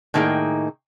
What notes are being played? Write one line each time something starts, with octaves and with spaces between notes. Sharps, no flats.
A2 D#3 A#3 D#4 G#4 G5